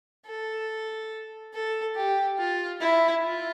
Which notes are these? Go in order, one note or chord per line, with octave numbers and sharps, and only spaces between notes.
A4
A4
G4
F4
E4
F4